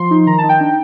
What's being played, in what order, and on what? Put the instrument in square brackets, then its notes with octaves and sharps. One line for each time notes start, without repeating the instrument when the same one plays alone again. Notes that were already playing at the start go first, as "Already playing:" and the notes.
Already playing: [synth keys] F3 C6
D#4
D#3 A#5
A5
D#4
G5
D4